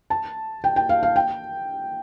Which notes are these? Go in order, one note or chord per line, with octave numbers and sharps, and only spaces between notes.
A5
G5
G5
F5
F5
G5